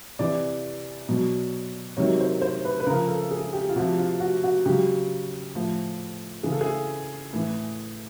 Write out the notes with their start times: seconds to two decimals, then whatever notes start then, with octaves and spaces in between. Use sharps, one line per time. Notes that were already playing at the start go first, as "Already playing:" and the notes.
0.19 C3 E3 D5
1.09 B2 F#3
1.97 C3 D#3 F#3 C#5
2.20 C5
2.42 C5
2.65 B4
2.80 B4
2.87 C#3 F3 A#4
3.08 A4
3.31 G#4
3.53 G4
3.69 F4
3.75 C3 F3 F#4
3.99 F4
4.20 F#4
4.44 F#4
4.66 C#3 F#3 G4
5.55 A2 F3
6.43 C#3 E3 G#4
6.52 A4
6.61 G#4
7.33 A2 E3